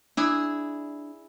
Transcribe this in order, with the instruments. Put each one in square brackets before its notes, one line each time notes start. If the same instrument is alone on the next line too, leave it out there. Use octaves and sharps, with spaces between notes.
[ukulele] D4 [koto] E4 G#4